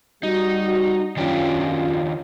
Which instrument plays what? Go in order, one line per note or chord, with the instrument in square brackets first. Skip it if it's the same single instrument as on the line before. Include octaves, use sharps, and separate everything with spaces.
[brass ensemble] G3 F#4 [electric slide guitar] D#4
[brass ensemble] F#2 C#4 F4 [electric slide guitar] D#3 D4 G4